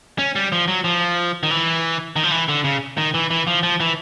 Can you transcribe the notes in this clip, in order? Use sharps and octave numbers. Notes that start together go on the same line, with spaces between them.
C#4
G3
F3
F#3
F3
D#3
E3
D#3
F3
E3
D3
C#3
D#3
E3
E3
F3
F3
E3